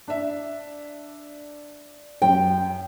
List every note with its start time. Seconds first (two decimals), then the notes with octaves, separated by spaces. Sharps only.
0.08 D4 E5
2.22 F#2 G5